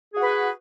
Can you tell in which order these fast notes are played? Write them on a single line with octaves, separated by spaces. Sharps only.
G#4 F#4 B4